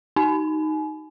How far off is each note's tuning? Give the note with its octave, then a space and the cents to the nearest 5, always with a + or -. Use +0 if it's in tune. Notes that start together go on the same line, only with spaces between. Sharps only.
D#4 +0 G#5 +35